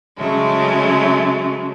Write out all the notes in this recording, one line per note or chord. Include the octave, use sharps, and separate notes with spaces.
C#3 F#3 G#3 A3